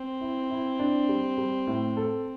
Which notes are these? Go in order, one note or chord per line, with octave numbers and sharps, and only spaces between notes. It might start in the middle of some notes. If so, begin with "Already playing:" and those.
Already playing: C4
E4
E4
D4
G3
G3
A2
A4